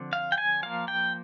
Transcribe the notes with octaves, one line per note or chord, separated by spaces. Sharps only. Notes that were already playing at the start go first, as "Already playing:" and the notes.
Already playing: D3 F3 C4
F5
G5
G#5
F3 A#3 F5
G5